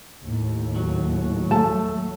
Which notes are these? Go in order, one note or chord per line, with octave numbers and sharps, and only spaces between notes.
D#2 A2
F#3
A3 A5